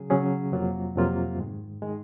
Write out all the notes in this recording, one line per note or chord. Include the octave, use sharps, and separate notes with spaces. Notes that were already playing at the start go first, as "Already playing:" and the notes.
Already playing: C#3 F#3 C#4 G#4
C#3 F#3 C#4 G#4
F2 C3 F#3 A#3 F4
F2 C3 F#3 A#3 F4
G#2 D#3 G#3
D#3 G#3